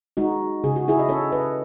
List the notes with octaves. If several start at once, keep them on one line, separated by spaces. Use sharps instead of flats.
G#3 D#4 F#4
C#3 G#4
F#4
E4 G#4
D#5
C#4 A4 C#5
B4 D#5